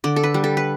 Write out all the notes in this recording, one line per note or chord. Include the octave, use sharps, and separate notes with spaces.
D3 D5
A4
B4
G3
A4
B4